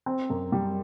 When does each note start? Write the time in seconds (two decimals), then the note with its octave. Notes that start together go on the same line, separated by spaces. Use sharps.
0.06 C4
0.30 F#2
0.52 G3